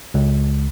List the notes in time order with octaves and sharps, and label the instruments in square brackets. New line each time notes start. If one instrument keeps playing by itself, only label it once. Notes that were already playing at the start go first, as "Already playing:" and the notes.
[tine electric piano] C#2